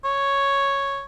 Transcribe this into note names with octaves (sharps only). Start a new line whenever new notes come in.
C#5